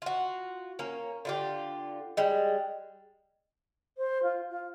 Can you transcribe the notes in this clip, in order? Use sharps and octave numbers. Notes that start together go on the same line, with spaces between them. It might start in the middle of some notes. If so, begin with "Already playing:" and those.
F4 F#4
A#3 C#4
D3 F4 G4
G3 G#3
C5
F4
F4